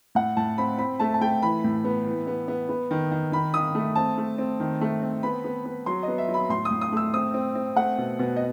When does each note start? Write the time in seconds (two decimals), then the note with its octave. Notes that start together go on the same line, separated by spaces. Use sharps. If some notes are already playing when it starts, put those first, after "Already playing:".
0.15 A2 F#5
0.37 A2 A5
0.58 C4 B5
0.78 C4 B5
1.00 A3 A5
1.14 A5
1.21 A3 G5
1.43 E3 B5
1.64 A2
1.84 B3
2.06 E3
2.27 B3
2.48 B3
2.69 B3
2.91 D#3
3.11 D#3
3.32 D#3 B5
3.54 D#3 D#6
3.75 A3
3.96 C4 A5
4.18 A3
4.38 C4
4.60 D#3
4.81 A3
5.02 C4
5.23 B3 B5
5.44 B3
5.65 B3
5.86 F#3 C6
6.03 D#5
6.08 B3
6.18 E5
6.29 F#3
6.34 B5
6.49 A2 C6
6.65 D#6
6.71 A2
6.81 D#6
6.92 A3 E6
7.14 C4 D#6
7.34 C4
7.55 C4
7.76 A3 F#5
7.98 B2
8.19 B2
8.36 D#5